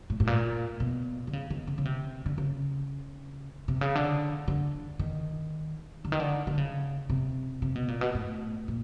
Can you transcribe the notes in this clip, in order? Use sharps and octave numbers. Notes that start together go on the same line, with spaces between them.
A2
A2
A#2
B2
D3
C#3
D#3
C#3
C#3
C3
D3
C#3
C3
C#3
D3
D3
D#3
D3
D#3
D3
D3
C#3
C3
C3
B2
A#2
B2
A2
A#2